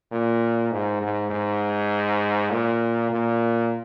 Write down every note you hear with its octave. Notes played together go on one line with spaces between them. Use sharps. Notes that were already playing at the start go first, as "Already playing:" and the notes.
A#2
G#2
G#2
G#2
A#2
A#2